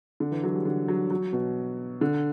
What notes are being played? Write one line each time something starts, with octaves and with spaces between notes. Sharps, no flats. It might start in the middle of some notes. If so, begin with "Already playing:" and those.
D3
E3
F#3
G3
D3
F#3
F#3
B2
D3